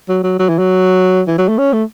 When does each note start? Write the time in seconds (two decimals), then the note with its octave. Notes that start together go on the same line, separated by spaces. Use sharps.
0.09 F#3
0.23 F#3
0.39 F#3
0.49 E3
0.59 F#3
1.28 E3
1.38 F#3
1.48 A3
1.58 C#4
1.73 A3